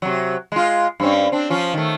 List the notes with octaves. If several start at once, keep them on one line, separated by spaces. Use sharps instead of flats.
C3 F#3
G#3 F4
G2 C4 C#4
C4 D4
F3 C#4 F4
D#3 A3